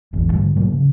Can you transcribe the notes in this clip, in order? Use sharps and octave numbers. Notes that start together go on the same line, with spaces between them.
D1 A1 E2 G#2
G#2 D3 G3
G#2 B2 F#3 A#3
C#3